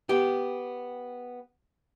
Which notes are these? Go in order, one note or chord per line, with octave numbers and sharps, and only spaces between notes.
B3 G4